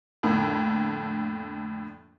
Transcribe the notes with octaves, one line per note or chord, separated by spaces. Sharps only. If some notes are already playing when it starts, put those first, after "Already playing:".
F2 A2 D3 A#3